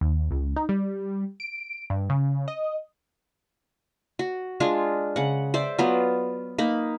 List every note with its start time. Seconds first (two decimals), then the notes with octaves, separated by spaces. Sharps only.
0.01 D#2
0.31 C#2
0.56 D#4
0.69 G3
1.40 D7
1.90 G2
2.10 C#3
2.48 D#5
4.19 F#4
4.60 G#3 D4 F4
5.16 C#3 F#5
5.54 C5 D5 E5
5.79 F#3 B3 F4
6.58 A#3 D#4 B5